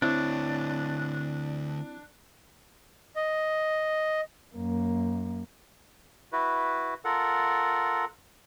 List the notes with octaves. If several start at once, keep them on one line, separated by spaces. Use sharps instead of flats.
D2 C4 D4 E4 C#5
D#5
F#2 A#3
E4 F#4 B4
F4 A4 A#4 F#5